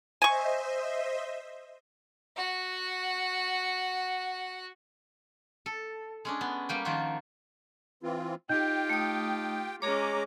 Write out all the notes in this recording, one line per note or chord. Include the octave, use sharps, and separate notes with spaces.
C5 D#5 E5 G#5 C#6
F#4 F#5
A4
G#3 C#4 D4
B3
G3 A#3 G5
D#3 F3 F4 F#4
E3 C4 F4
D#4 F4 G4 D#5 G5 G6
A3 D#6
G#3 C#4 G#4 C#5 A#5 D6